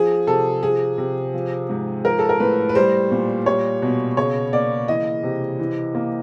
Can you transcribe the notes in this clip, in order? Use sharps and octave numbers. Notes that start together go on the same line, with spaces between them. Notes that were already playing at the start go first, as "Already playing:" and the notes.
Already playing: F3 G#4
C3 A4
F3 G#4
C3
F3
G#2
F3 A#4
A4
A#4
A2 B4
B4
G3 C5
A#2
G3 C#5
B2
C#3 C#5
A#3 D5
E3 D#5
C3
E3
A#3